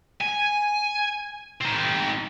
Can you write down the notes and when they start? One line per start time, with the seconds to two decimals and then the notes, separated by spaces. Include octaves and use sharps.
0.21 G#5
1.61 C4 D#4